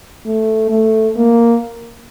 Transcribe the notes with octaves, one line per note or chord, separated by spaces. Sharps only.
A3
A3
A#3